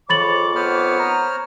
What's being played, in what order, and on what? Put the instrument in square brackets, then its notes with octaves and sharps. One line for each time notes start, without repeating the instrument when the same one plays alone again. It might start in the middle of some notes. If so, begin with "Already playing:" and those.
[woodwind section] F2 G#2 D6 [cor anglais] C#5 [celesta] B5 A6 F#7
[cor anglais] B3 [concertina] C5 C#5 F6
[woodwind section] A#5